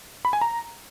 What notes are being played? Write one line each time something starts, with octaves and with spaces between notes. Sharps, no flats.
B5
G#5
A#5